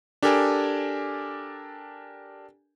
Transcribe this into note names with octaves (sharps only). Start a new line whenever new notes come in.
D4 G4 A4 A#4 G#5